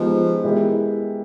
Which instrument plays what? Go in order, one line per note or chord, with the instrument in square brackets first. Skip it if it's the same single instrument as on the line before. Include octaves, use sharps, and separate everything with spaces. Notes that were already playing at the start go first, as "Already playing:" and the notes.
Already playing: [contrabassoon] F3 [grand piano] G#3 B3 D#4 G4
[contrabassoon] E3 [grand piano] G#3 B3 E4 G4 A#4